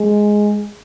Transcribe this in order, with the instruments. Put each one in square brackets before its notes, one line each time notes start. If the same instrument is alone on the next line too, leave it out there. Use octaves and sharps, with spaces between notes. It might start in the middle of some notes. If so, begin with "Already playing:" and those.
Already playing: [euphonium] G#3